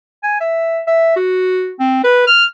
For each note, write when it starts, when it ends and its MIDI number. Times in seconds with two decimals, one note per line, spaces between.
0.24 0.37 80
0.40 0.80 76
0.87 1.15 76
1.16 1.72 66
1.80 2.02 60
2.04 2.26 71
2.27 2.45 89